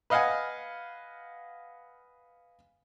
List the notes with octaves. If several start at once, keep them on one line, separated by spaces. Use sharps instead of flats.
B4 D#5 F5 F#5 G#5